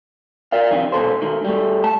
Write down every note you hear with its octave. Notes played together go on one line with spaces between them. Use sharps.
A#4 D5 F5
F2 C3 D#3
B2 A4 C5
D#3 A3
G3 A3
A5